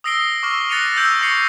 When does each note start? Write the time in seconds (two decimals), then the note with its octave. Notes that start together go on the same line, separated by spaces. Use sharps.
0.04 D#6 E6 A#6 C7 D7 G7
0.43 C#6 D6 E6 F6
0.70 F#6 A6 A#6 C#7 D#7 F7
0.96 E6 G6 D7 F7 F#7
1.21 C#6 A#6 C7 C#7